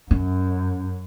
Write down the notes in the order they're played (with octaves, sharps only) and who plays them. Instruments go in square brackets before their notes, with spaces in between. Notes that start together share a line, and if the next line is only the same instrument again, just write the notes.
[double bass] F#2 [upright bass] C#4